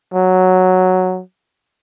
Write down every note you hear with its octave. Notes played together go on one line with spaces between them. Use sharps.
F#3